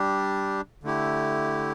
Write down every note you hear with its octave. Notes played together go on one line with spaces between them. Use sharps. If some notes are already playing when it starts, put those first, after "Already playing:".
Already playing: G3 D4 G4
D3 A3 E4 G4